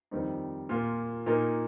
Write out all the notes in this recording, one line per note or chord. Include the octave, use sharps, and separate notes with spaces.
F2 D#3 G3 C4 D#4
A#2 A#3 F4
A#2 A#3 D#4 A#4